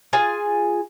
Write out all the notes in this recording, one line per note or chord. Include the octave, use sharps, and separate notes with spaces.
F4 G#4 G#5